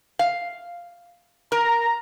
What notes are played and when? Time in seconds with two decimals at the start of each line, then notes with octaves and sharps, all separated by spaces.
0.19 F5
1.52 A#4 A#5